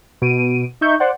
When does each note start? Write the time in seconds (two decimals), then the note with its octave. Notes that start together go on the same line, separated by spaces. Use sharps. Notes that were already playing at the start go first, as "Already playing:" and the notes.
0.22 B2 D7 D#7
0.81 D#4 E5 C#6 G6
1.00 C5 D5 F#5